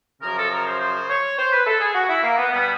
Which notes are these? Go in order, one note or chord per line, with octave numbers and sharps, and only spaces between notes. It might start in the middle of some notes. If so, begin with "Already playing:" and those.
F#2 C#3 F3 A#4
A4
A#4
C5
C5
C#5
C5
B4
A4
G#4
F#4
E4
A#3
B3
B2 G3 B3